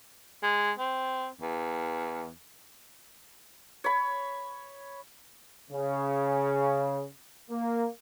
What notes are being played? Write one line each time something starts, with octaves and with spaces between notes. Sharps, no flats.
G#3
C4
E2
C#5 B5
C#3
A#3